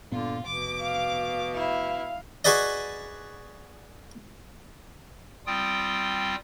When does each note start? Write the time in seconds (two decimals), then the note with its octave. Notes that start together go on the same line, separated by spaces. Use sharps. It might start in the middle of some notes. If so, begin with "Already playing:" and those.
0.11 G2 A#2 D3 B3 F4
0.46 F1 B2 D6
0.82 F5
1.54 E4 F5
2.45 F#4 G#4 B4 D5 D#5
5.46 G3 C4 F4 G5 D#6